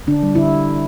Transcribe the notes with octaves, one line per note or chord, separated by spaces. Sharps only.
D3 D4
G3
D3 E4